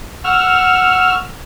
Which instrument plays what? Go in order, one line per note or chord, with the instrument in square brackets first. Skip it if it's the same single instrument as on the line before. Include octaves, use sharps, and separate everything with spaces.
[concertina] F#5 C#6 [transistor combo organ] E6 F6